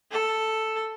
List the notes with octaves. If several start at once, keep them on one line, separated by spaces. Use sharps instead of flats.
A4